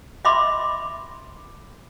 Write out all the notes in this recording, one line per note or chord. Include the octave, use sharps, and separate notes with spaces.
D#5 E5 B5 C6 D6